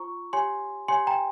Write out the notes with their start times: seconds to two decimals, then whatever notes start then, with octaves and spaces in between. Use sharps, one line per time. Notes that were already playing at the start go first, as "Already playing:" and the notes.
Already playing: F4 C5 A#5 C#6
0.33 G4 C#5 G#5 C6
0.88 G4 C#5 G#5 C6
1.07 G5 A#5